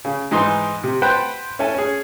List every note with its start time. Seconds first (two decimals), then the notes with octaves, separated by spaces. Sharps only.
0.05 C#3
0.31 G#2 E3 D#4 C6
0.84 C3
1.02 B4 C5 F#5 G5 A5 B5
1.59 C#4 E4 A4 G#5
1.75 C#4 G#4